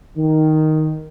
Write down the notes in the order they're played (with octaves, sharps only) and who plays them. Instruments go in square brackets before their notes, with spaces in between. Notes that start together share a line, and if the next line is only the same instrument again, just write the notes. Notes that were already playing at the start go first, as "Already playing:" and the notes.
[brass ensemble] D#3